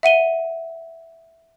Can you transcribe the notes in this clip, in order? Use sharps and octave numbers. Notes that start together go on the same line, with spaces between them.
E5 F#5 D#7 G7